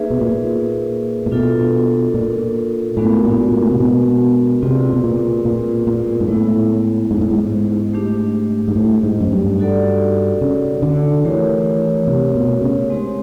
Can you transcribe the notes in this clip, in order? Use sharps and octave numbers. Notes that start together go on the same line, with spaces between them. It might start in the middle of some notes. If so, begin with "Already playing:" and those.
Already playing: A#3 D#4 G#4 B4 E5
B2
A#2
A#2
B2 D4 F4 A4
A#2
A2 G#3 B3 D4 F#4 A#4
A#2
A2
C3
B2
C3 C4 F4 G#4 B4 D5
B2
A#2
A#2
A#2
G#2
A2 G#3 B3 E4
G#2
A2
G#2
A3 D4 G4
G#2
A2
G#2
F#2
G2
D#4 F#4 A4 D5 F#5
C#3
D3
E3 A3 D4 G4 A#4 C#5
C3
B2
C#3
G#3 C4 D#4 G4 C5